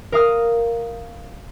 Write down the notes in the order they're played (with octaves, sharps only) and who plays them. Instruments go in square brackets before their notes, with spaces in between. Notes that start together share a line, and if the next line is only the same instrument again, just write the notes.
[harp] A#4 F5 D#6 F6